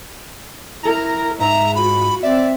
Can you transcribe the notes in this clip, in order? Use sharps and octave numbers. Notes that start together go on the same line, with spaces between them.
E4 A#4 A#5
G#2 E5 A#5
F4 F#4 B5
C4 D5 E5